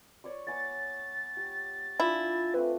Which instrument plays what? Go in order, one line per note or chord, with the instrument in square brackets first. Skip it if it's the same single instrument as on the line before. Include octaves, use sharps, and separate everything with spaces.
[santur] C#5 D5 C#6
[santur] B3 G#5 C#6 [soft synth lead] A6
[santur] G4
[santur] D4 F4 G#5 [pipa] E4
[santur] A3 C4 [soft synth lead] B4